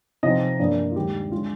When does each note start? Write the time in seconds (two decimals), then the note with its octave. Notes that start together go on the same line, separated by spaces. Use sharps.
0.23 C3 F3 C4 D#4 D#5
0.59 G2 F3 A#3 D4 D5
0.91 F4
0.95 D#2 D#3 G3 G#3 G4
1.32 D3 G#3 F4